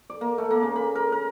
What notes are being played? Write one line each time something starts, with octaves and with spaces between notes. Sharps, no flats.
D5
A#3
A3
A#3
C#3
B5
A#4
A#4